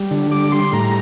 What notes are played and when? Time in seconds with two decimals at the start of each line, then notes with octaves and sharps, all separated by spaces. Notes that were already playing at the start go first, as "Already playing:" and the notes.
Already playing: G3
0.11 D3
0.31 G3 D6
0.52 G3 C6
0.72 A2 A#5